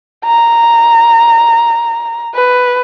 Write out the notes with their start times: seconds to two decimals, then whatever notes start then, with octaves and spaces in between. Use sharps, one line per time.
0.25 A#5
2.35 B4